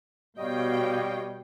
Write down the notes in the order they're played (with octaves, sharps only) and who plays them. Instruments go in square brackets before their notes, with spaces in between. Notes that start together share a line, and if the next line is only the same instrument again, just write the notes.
[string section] B2 G5 [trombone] G3 [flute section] C#5 F5 C#6 [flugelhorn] D#5